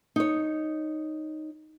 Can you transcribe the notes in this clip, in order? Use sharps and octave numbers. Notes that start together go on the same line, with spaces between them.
D#4 C#5